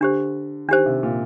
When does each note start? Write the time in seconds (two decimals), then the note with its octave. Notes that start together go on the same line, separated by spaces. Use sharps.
0.01 D3 D4 G4 C5
0.68 D#3 D4 G4 C5
0.86 C3
1.03 A#2